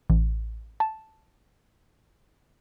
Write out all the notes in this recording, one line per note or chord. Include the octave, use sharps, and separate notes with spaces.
A1
A5